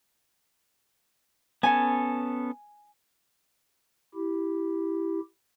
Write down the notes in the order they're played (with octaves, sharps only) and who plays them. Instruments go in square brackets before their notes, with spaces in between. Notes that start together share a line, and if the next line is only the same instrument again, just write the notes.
[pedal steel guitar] B3 C#4 A4 [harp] G#5
[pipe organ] E4 G4